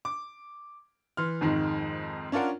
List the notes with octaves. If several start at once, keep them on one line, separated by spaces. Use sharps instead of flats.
D6
E3 C6 F6
F2 G#2 D#3 G#3
C#4 D4 F4 A#4 F#5